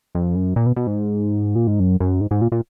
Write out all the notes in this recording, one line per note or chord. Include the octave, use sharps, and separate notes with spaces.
F2
F#2
A#2
B2
B2
G#2
A#2
G#2
F#2
F#2
G#2
G#2
A#2
A#2